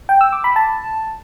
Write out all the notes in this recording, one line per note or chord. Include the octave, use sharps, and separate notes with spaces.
G5
E6
D6
B5
A5